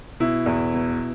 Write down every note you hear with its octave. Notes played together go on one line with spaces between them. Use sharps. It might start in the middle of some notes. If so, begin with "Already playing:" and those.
B2 E4
E2
B2